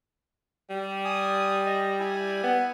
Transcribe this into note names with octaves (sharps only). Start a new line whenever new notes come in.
G3
G#5 D#6
D#5
E4 G#5
B3